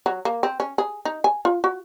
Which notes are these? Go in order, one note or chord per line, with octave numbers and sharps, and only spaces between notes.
F#3
A#3
C4
C#4
G#4
D#4
G#5
F4
F#4